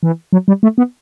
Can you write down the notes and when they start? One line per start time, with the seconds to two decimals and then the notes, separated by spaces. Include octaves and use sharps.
0.03 E3
0.33 F#3
0.48 G3
0.63 A3
0.78 B3